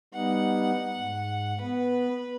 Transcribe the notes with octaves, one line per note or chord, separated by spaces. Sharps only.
G3 B3 D#4 F#5
G#2
B3 B4